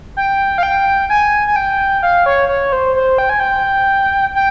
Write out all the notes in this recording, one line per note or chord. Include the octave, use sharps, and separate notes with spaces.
G5
F5
G5
G#5
G#5
G5
F5
C#5
C#5
C5
C5
G5
G#5
G5
G5